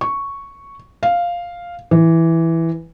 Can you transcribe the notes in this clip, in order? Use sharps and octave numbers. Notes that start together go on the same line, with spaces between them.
C#6
F5
E3